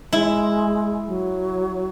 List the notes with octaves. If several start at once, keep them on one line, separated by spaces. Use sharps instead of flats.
G#3 E4
F#3